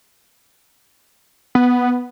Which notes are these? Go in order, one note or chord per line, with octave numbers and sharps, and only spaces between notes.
B3